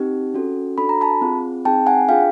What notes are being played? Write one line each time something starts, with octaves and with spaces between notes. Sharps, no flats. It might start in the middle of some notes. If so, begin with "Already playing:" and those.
Already playing: C4 D#4 G4
C#4 F#4 A4
D4 F#4 A4 B5
A#5
A5 B5
C4 F4 G#4
C4 D#4 G#4 G5 A5
F#5 G#5
D4 F4 G#4 F5 G5